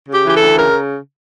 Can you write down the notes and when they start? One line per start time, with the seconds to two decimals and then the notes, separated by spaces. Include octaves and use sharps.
0.09 C#3 G4
0.24 E3 G4
0.35 A4
0.41 D2
0.57 C#3 A#4